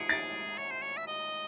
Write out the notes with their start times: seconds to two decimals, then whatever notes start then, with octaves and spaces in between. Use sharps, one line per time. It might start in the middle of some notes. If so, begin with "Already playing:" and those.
Already playing: G#4 C#7 D7
0.09 A6
0.58 C#5
0.71 C5
0.83 C#5
0.97 E5
1.07 D#5